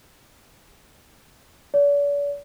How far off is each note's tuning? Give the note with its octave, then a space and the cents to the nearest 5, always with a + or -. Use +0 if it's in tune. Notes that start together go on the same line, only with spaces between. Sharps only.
D5 -45